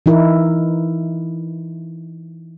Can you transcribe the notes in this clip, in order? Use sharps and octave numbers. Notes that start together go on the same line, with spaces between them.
E3 D#4 E4 A#4